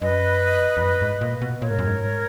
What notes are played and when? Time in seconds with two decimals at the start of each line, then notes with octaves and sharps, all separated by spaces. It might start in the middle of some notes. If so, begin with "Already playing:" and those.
0.01 F#2 B4 D#5
0.77 E2
0.81 F#2
1.02 G#2
1.21 A#2
1.41 B2
1.61 A#2 A#4 C#5
1.71 G#2
1.78 F#2
1.87 G#2